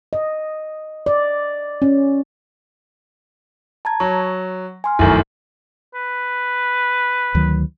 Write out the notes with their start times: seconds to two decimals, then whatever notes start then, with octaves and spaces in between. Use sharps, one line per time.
0.13 D#5
1.06 D5
1.82 C#4
3.85 A5 A#5 G#6
4.00 F#3 C#6
4.84 G#5 C6 F6
4.99 F1 F#2 D#3 E4 A4
5.94 B4
7.35 D2 D#3 F#3